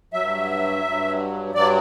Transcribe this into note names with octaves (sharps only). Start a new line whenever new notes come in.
G2 F#3 E5
G2 F#3
G2 F#3 D5